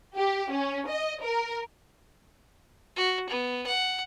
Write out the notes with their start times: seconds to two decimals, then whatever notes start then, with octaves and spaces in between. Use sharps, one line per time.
0.15 G4
0.50 C#4
0.88 D#5
1.23 A#4
2.96 F#4
3.29 B3
3.67 F#5